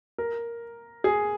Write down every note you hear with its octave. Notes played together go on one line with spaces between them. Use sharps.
A#4
G#4